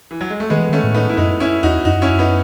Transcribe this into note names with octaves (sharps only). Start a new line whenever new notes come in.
E3
F#3
G#3
A3
D#3 G#3 B3
E3
D#3 A3 C#4
A2
B3 D#4
E4
F#2 B3 D#4
C#4 E4
E2 D#4 F#4
F#2 D#4 F#4
C#4 E4
B3 D#4